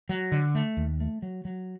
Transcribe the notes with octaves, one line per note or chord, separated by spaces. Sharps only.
F#3
D3
A3
D#2
A3
F#3
F#3